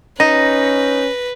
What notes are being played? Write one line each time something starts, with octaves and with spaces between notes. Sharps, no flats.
C#4 D#4 B4 A#6